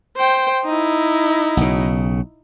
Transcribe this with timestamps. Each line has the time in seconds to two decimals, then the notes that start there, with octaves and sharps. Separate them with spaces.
0.17 C5 G5
0.65 D#4 E4
1.57 B1 C#3